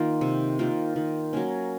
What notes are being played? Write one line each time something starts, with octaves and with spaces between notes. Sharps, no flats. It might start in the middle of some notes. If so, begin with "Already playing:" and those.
Already playing: D#3 A#3 F4
C3
D#3 A#3 F4
D#3
F#3 A#3 C#4